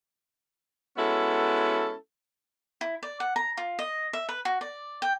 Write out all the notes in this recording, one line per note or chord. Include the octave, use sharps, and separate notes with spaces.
G#3 B3 C#4 E4 F#4 A4
E4
D5
F#5
A#5
F4
D#5
E5
B4
F#4
D5
G5